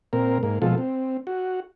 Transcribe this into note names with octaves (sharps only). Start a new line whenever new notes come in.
A#2 C4 A#4
G#2 A#3
B2 F3 G#3 F4 A4
C4
F#4